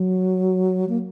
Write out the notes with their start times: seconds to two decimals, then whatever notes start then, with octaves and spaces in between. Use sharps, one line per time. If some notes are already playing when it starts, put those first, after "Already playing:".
Already playing: F#3
0.89 A#3